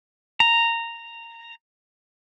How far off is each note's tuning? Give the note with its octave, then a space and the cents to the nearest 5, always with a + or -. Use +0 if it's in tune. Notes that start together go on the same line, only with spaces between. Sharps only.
A#5 -10